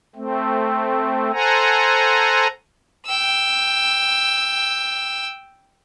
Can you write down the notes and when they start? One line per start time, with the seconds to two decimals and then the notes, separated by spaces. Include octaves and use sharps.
0.15 A3 C4
1.33 A4 C5 F#5 G#5 A#5
3.06 G5 E6